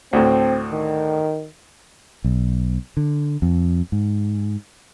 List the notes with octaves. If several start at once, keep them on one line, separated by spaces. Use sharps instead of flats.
D2 A2 C4
D#3
B1
D3
F2
G#2